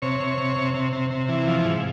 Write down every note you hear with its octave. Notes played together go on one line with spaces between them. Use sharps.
C3 C#5
C3
C3
C3
C3
C3
C3
E3
F3
G#2